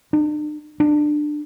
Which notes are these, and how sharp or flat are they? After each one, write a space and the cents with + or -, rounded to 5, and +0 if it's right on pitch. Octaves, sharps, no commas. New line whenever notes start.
D4 +45
D4 +20